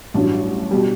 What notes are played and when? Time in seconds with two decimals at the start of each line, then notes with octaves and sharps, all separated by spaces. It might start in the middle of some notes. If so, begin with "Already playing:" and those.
0.14 A1 G2 F#3 D4
0.71 B2 G3